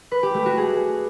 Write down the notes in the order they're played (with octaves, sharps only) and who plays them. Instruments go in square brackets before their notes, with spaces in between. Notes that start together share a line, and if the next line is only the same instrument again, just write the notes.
[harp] B4
G4
A3
F#4
G#4